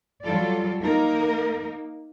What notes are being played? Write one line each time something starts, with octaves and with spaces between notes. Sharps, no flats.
F#3 G3 F4 A4 D5
A#3 D#4 A#4